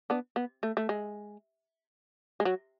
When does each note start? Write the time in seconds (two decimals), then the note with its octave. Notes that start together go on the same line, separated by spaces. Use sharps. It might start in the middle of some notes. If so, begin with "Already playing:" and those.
0.10 B3 D4
0.36 B3
0.63 A3
0.77 A3
0.89 G#3
2.40 G#3
2.45 F#3